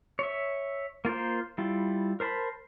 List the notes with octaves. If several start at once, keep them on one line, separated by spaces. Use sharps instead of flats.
C#5 E5
A#3 F4 A#4 C5
G3 E4 F4
A#4 C5 A5 B5